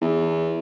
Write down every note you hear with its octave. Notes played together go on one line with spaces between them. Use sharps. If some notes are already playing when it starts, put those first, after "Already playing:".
E2